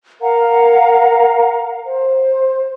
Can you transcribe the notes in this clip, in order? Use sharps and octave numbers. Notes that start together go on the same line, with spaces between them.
A#4 F5 F#5 A#5
C5